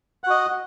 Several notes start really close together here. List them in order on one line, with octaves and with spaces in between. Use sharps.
F#5 F#4 D#5